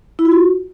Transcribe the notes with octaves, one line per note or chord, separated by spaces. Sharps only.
E4
F4
F#4